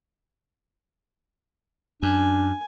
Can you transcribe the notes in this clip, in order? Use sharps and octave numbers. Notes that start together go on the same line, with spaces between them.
F#2 D4 G#5